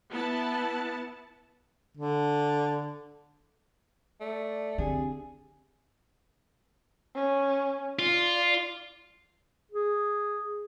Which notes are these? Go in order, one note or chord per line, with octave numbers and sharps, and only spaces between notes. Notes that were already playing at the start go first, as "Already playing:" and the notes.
B3 E4 A5
D3
A3 D5
D3 C4 G4 G#4 G#5
C#4
F4 D5
G#4